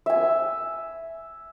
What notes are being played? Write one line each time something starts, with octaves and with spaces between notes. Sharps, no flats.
E5 G#5